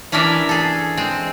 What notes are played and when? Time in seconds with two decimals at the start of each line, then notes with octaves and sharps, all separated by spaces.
0.12 E3 C#4 D4 A#4 E5
0.49 G#4 A4
0.97 G#3 C4